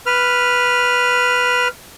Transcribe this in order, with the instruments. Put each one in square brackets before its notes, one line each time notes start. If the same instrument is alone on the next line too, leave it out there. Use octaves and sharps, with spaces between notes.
[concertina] B4 F6